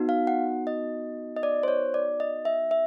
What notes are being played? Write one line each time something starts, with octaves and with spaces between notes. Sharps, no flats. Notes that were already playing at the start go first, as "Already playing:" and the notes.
Already playing: B3 D#4 F#4
F5
F#5
D#5
D#5
D5
C5
C#5
D5
D#5
E5
E5